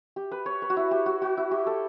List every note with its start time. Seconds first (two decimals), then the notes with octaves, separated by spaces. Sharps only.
0.16 G4
0.31 B4
0.46 C#5
0.62 B4
0.70 F#4
0.77 E4
0.91 G4
1.06 F#4
1.22 F#4
1.37 E4
1.51 G4
1.67 A4